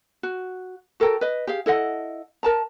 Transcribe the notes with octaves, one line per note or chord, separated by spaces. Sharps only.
F#4
F#4 A4 A#4 G5
B4 D#5
G4 G#4 F5
E4 A4 D#5 F#5
A#4 A5 A#5